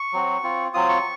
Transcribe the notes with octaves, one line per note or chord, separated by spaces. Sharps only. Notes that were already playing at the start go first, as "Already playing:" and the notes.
Already playing: C#6
F#3 C4 F#4
C4 F4
F#3 C4 F4 D#6
C#6